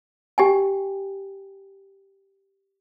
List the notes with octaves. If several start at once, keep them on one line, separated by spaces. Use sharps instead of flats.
G4 G5 G#5